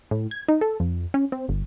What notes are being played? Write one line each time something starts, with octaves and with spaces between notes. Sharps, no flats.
A2
G#6
D#4
A4
F2
C#4
C4
G1